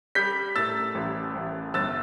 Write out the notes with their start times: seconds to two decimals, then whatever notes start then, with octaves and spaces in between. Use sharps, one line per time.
0.15 G3 G6 B6
0.56 A2 E6 A6
0.95 A1
1.35 A1
1.74 G1 E6 A6